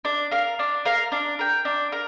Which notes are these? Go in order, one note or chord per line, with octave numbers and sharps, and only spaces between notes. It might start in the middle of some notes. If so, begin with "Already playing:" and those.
D4
A#4 F5
D4
A#4 F5
D4
A#4 G5
D4
A#4